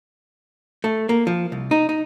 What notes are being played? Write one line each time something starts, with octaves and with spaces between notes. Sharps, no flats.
A3
A#3
F3
C2
D#4
D#4